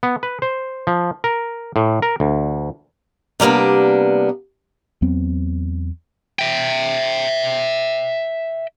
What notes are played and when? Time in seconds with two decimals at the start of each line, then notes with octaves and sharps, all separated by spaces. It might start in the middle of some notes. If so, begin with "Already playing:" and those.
0.03 B3
0.23 B4
0.42 C5
0.87 F3
1.24 A#4
1.76 A2
2.02 A#4
2.20 D2
3.40 C3 G3 A#3 B3 D4
5.02 E2 F#3 B3 C4
6.39 E5 G5